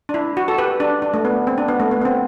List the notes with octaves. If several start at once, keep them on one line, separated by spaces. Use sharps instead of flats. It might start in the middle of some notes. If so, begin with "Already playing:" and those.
D4
E4
F#4
A4
G4 B4
D4
D4
A3
B3
C4
D4
B3
A3
B3
B3
C4